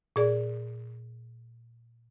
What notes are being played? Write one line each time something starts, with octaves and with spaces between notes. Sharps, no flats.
A#2 G#4 D5